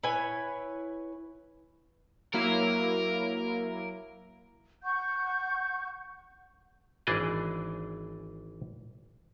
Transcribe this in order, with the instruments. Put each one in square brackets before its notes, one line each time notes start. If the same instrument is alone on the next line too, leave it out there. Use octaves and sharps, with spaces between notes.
[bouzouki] E4 B4 C#5 G#5
[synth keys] F#3 A#3 E4 [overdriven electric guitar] A#4
[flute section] F#5 C#6 G6
[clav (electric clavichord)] G#1 E3 D4 G#4 D5 D#5